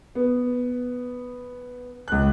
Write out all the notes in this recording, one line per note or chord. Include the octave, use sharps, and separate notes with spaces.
B3
C#2 F#6